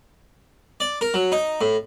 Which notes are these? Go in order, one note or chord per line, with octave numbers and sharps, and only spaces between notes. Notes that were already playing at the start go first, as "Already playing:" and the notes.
D5
A#4
F#3
D#4
A2